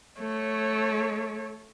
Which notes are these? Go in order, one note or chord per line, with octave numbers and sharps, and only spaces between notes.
A3 C#5